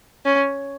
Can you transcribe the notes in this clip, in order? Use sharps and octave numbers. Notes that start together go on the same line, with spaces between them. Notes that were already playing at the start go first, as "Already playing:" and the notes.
C#4